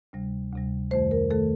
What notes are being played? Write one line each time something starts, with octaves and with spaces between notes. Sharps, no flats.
D2 C3 G3
D2 C3 G3
F2 D#3 A3 C5
A#4
D#3 A3 A4